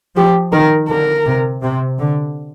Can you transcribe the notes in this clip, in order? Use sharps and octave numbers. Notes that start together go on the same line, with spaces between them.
F3 G4
D#3 A#4
D3 A#4
C3
C3
D3